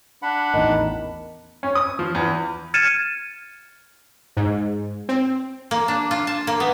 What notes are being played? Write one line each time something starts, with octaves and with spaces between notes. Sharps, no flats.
D4 F#5 B5
A1 E2 D#3
C#4
D#6
F3
E2
F6 G#6 A6 C#7 D#7 E7
G#2
C4
A#3
D4
F4
A5
A#3
B3